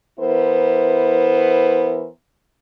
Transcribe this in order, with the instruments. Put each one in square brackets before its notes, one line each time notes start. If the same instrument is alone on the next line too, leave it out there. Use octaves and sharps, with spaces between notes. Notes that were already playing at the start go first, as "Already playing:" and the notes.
[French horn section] E3 B3 E4 A#4 C5